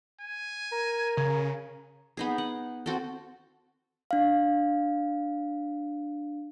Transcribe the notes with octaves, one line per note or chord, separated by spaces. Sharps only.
G#5
A#4
C#3
B3 D#4 G#4
F#5
C4 F#4 A4
D4 F5